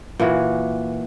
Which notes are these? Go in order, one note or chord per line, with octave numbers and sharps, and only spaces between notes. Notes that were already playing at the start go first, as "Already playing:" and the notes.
A#2 E3 F#4